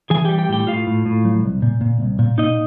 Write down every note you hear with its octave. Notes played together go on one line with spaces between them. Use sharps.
E3 G#4 G#5
G3 G4 G5
G4 G5
A2 G4 G5
A2 F4 F5
A2
A2
F#3
C2
A#2
A#2
C2
A#2
A#2 D#4 D#5